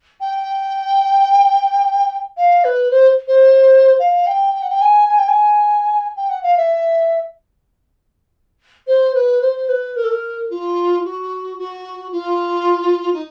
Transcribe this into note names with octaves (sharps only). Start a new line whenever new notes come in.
G5
F5
B4
C5
C5
F5
G5
G5
F#5
G5
G#5
G#5
G5
G#5
G5
F#5
F5
E5
C5
B4
C5
B4
A#4
A4
A#4
F4
F#4
F#4
F4
D#4